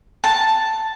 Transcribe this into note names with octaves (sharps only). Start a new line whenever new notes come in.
A5